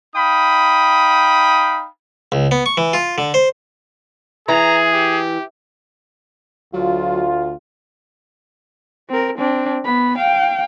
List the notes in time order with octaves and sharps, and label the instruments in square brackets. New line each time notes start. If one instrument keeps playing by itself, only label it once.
[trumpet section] D#4 F5 G5 B5 D#6
[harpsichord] C#2
B3
C#6
E3
F4
D3
C5
[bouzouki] E3 [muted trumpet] G#4 [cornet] A#5
[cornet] G4
[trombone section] D2 F4 [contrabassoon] F#3
[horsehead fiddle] C4 A#4
C4 D4
B3 B5
F5 G5